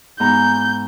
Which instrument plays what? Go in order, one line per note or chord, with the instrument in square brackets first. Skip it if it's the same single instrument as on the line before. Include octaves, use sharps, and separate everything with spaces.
[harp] G#2 B3 A#5 [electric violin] G6